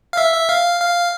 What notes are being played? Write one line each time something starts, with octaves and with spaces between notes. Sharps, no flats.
F5
E5
E5
F5
F5